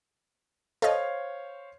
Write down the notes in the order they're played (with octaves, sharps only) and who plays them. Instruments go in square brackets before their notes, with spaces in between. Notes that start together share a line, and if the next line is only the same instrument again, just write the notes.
[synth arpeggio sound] A4 D#5 [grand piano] C5 C#5 F5